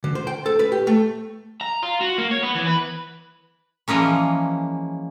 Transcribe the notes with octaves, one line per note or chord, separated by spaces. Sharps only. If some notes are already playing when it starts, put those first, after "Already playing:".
D3
C5
G5
A4
B4
G4
A3
A#5
F4
F#4
A#3
C#5
B3
E3
B4
E3 F3 G#3 A#3 C#4